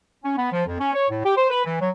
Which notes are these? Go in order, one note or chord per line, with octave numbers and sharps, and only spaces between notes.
C#4
B3
F3
F2
C#4
C#5
A2
G4
C5
B4
E3
F#3